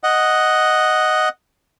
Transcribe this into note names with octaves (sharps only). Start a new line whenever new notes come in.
D#5 F#5